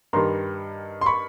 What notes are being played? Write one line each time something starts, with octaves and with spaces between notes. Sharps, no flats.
G2 D#3 G3 A#5 C6
C6
B5 C#6